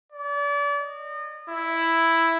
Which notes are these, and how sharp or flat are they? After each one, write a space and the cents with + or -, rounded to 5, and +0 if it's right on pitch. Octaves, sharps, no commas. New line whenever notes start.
D5 -35
D#5 -40
E4 +0